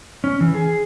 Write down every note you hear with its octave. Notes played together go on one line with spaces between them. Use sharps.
C#4
E3
G#4